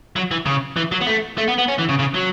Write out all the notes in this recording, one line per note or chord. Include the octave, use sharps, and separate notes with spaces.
F#3
E3
C#3
E3
F#3
B3
A3
A3
B3
B3
C#4
E3
C#3
C#3
F#3